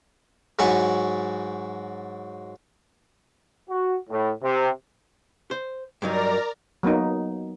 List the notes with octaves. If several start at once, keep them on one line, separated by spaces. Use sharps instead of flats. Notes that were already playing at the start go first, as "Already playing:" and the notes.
G#2 F#3 E4 G#5 C#6
F#4
A2
C3
C5
G2 F#3 D#4 A#4 D5 A#5
F#3 A#3 B3 D#4